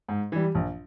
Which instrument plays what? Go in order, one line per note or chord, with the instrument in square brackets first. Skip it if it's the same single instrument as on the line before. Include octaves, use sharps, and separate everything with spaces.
[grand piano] G#2
E3 G3
A#1